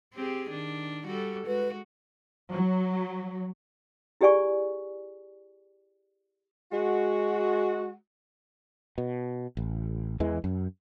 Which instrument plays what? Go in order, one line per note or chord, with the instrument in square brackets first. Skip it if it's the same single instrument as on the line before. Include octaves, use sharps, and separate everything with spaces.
[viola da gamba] C4 G4 G#4
D#3 D4
G3 F#4 A4
[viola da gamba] G#3 F#4 [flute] B4
[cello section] F#3
[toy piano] E4 G4 G#4 D5 G#5 C#6
[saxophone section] G#3 F#4
[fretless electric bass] B2
A1
E2 E3 G#3
F#2